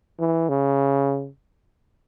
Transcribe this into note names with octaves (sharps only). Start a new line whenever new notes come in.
E3
C#3